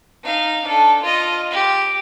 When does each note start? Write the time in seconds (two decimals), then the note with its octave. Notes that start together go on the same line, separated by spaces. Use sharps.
0.24 D#4 F5
0.65 D4 A4
1.03 F4 D#5
1.51 G4